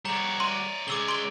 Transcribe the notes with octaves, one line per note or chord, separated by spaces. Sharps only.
G3 F#4 C#5 D5 A#5
C6 D#7
C#3 G#3 D6 E6 G7
C6 D7 G7